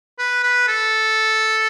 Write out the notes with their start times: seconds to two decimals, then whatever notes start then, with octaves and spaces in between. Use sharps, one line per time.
0.19 B4
0.43 B4
0.68 A4